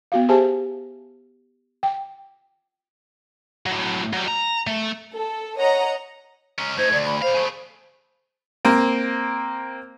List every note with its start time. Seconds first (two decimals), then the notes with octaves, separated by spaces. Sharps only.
0.12 B3 F#4 F5
0.29 G4 G#4 C5 E5 G#5 A5
1.83 G5
3.66 A2 F#3
4.13 F#3 G3
4.28 A#5
4.67 A3
5.14 A4
5.58 C#5 D#5 F#5 A#5
6.59 G#3 C#4 A#5
6.78 A3 D#4 C5 G#6
6.93 D2 D5
7.06 B5
7.22 D3 C5 F5
7.35 G#3 A3
8.65 A#3 C4